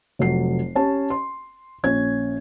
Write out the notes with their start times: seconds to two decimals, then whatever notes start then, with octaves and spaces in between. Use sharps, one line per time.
0.19 F1 F#3 C7
0.76 C#4 G4 A5
1.10 C6
1.84 A#1 C#4 G#6